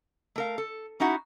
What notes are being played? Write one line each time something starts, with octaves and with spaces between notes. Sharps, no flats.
A3 A#4 F5
A4
C#4 D#4 E4 F#4 F#5